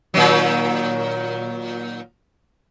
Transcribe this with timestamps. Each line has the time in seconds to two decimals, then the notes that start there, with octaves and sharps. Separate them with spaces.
0.14 A#2 D#3 F#3